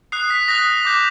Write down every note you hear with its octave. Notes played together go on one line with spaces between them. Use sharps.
D#6 F#6 C7
B6
D#6 F#6 A#6
D6 G6